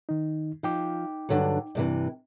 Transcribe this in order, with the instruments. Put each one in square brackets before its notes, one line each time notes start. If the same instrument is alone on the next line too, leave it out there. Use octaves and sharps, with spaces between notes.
[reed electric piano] D#3 D#4
[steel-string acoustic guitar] F3 [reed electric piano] D#4 G5 D6
[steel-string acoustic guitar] G2 D3 F#3
G2 C3 E3